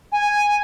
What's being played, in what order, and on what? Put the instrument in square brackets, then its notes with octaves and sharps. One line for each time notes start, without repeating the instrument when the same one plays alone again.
[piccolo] G#5